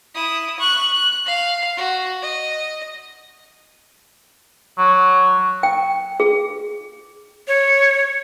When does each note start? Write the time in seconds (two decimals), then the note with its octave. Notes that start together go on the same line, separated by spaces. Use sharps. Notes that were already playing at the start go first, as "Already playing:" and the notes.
0.14 E4 D#6
0.59 C#6 F#6
0.93 F#6
1.26 F5
1.77 F#4
2.22 D#5
4.78 F#3
5.63 G5
6.20 G#4
7.48 C#5